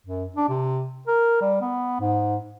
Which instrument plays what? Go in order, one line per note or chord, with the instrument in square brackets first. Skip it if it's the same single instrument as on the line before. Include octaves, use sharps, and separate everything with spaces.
[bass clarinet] F#2
D4
C3
A#4
G3
B3
G#2